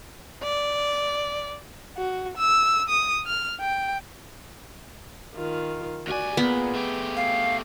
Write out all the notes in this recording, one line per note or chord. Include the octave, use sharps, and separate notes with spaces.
D5
F#4
E6
D#6
F6
G5
D#3 F4
D2 F#4 D5 G#5
A#2 B3 G#4
A3 G4
F5